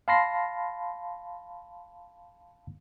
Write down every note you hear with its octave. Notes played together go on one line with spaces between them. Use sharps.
F5 A5 B5 C6 A#6 C7